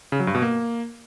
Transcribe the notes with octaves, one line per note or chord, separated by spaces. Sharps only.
C#3
F#3
G2
B2
A#3